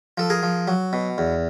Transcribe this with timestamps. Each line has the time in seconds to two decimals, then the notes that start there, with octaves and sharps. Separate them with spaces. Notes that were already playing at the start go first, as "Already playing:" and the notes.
0.18 F3 A4
0.30 G#4 A#4
0.43 F3
0.68 F#3
0.93 B2
1.18 E2